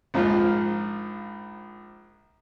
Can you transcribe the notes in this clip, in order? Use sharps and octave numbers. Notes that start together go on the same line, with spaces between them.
A#1 G#2 F3 F4